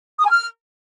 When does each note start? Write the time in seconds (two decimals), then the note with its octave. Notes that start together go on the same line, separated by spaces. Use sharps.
0.19 D#6
0.24 G#5
0.30 F6